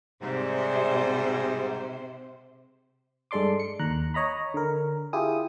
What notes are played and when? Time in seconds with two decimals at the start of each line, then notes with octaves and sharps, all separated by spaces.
0.22 G#2 C3 G3 C5
3.31 G2 G#3 A4 D5 C6 D6
3.60 C#7
3.80 D#2 A#5 F#6
4.14 C#5 D#5 A#5 B5
4.54 D3 A#4
5.13 E4 F4 G4 G#4 D#6